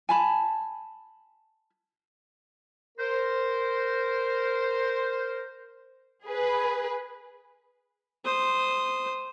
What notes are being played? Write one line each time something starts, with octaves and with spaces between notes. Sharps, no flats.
G#5 A5 B5
A#4 C5
G#4 B4
C5 D#6